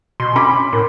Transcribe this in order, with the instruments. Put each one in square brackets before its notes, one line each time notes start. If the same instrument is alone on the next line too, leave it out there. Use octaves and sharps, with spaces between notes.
[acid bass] B2 [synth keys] C6
[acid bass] C#4 [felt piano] B5 D6
[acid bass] A2 [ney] A#4